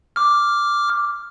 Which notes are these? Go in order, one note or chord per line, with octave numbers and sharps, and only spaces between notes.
D6 F6